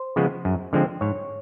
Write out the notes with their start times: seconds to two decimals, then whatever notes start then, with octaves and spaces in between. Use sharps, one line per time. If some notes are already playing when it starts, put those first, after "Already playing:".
Already playing: C5
0.16 C#3 F3 G#3 B3
0.45 F#2
0.73 D3 F3 G#3 C4
1.01 G#2 C#5